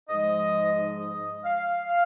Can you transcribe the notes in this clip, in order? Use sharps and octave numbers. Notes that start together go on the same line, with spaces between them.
G#2 F3 G#3 D#5
D#5
F5
F5